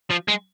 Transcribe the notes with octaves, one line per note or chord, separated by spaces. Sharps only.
F3
G#3